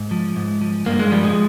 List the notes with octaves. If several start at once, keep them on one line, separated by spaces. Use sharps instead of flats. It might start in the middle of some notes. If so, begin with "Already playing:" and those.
Already playing: G#2
F3
G#2
F3
G2 A#3
G#3
F3 G3
G#3